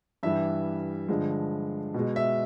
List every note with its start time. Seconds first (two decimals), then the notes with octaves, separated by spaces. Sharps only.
0.23 G2 E3 G3 E5
1.09 G2 D3 F3 G#3
1.94 B2 G#3
2.16 E5